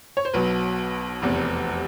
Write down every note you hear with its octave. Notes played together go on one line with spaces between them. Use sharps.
C#5
C5
B1 B2 F#3 B4
F1 E2 C3